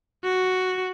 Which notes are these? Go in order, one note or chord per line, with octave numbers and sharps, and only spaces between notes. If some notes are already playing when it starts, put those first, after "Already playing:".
F#4